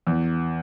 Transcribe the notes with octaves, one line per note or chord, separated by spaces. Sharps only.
E2